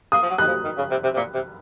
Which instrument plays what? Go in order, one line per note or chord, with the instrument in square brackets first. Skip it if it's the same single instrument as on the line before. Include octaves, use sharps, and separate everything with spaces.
[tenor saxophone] A#3 [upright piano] D#6
[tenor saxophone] F3
F#3
[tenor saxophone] D#3 [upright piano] F#6
[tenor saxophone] F3
D#3
C#3
C3
C3
C3
A#2
C3